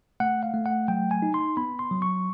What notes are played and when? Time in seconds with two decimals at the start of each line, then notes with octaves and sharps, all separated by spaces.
0.20 A3 F#5
0.43 F5
0.54 A3
0.66 F#5
0.88 F#3 G5
1.11 G#5
1.22 D#4
1.34 C6
1.57 B3 B5
1.79 C6
1.91 F#3
2.02 C#6